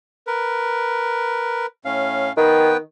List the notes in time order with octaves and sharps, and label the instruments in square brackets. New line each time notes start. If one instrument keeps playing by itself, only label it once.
[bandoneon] A#4 B4
A2 C#4 F5
[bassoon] D#3 [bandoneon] B3 B4 G5